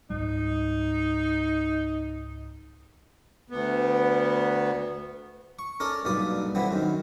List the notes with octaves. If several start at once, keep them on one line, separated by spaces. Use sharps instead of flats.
C#2 G#2 G3 D#4
D2 B3
C#6
C#4 A4 A#4 D5
B1 G2 A#2 D5 D#6
D3 E3 B3 C4
F#2 D#3